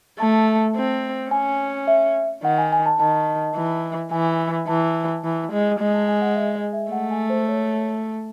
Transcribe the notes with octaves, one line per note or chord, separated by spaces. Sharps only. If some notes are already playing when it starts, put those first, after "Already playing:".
A3 A5
C4
C#4 G#5
E5
D#3 F#5
G#5
G#5
A5
D#3 A5
E3
E3 G#5
E3 A5
E3
G#3
G#3 G#5
A5
G#5
F#5
E5
D#5
E5
A3 F#5
G#5
C5
C#5